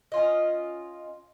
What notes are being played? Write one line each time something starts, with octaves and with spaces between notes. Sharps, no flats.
C#4 F4 D#5